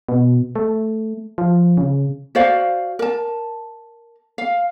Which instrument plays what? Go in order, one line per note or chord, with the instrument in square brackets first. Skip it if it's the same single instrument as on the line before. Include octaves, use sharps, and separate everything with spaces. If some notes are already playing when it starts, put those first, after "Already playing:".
[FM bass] B2
A3
F3
C#3
[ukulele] F#4 C5 D5 F5
A#4 A5
F5